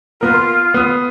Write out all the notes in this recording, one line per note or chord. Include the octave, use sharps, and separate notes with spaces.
A#3 B3 F4 A#4
C6
B3 D#6